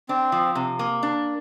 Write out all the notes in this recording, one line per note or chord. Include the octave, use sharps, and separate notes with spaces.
C4 D4
F3
C3
A#3
D4